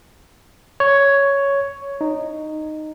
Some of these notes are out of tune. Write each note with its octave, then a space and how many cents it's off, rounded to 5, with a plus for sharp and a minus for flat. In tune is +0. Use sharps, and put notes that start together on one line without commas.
C#5 +5
D#4 -10